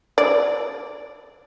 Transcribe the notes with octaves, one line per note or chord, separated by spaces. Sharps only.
D5